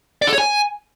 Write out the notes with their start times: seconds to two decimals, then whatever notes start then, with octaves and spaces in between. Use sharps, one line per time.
0.22 D5
0.27 A4
0.33 C#5
0.38 G#5